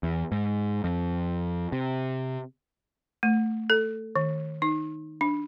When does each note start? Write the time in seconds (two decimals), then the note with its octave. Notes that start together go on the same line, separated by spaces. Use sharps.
0.03 E2
0.32 G#2
0.84 F2
1.72 C3
3.23 A3
3.70 A4
4.16 D#3
4.62 D#4
5.21 D4